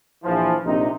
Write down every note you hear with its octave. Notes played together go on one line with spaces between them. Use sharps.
A#1 E3 F3
A#1 C3 D#4